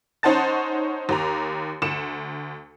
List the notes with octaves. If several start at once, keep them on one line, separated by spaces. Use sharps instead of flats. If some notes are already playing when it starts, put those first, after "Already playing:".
C#4 D#4 C5 F#5 A5 A6
D#2 A#5
D2 C#7 E7